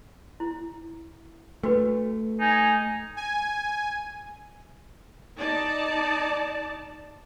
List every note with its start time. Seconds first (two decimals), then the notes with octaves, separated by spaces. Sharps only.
0.40 E4
1.63 A3 D4 F#4 B4
2.41 D#4 G#5
3.17 G#5
5.38 D#4 D5 A5